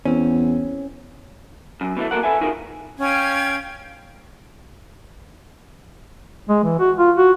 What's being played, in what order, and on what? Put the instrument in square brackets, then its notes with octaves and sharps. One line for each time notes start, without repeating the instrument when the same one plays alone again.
[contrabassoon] E2 [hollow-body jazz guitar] C4 C#4
[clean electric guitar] F#2
B2 E3 A3
A#3 F#4 A4 A#4 F#5
A4 B4 E5 G#5
D#4 F4 F#4 G#4 A#4
[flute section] C#4 F5 G5 G#6
[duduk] G#3
E3
F#4
F4
F#4